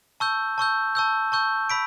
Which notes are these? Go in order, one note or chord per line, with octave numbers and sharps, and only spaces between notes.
A5 C#6 E6 G6
A5 C#6 E6 G6
A5 C#6 E6 G6
A5 C#6 E6 G6
B5 E6 B6 D7